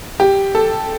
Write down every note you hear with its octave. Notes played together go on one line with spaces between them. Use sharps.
G4
A4